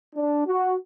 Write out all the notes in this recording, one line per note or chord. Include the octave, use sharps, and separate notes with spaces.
D4
F#4